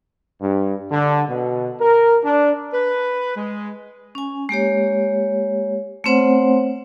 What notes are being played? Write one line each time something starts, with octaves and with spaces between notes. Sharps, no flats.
G2
D3
B2
A#4
D4
B4
G#3
C#4 G#5
G#3 A#3 G4 C#5
A3 B3 C4 C5 C#5 F#5